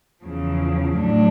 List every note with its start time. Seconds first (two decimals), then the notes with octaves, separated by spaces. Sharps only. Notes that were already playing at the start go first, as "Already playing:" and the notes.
0.24 E2 C#3 F3
0.97 A2 F#3 A3 D4